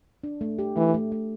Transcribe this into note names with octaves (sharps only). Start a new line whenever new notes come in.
D4
A3
G4
E3 A3
A3
A3